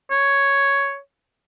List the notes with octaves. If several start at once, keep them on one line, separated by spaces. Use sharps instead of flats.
C#5